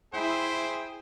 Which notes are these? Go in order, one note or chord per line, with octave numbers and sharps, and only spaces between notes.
E4 G#4 C5 G5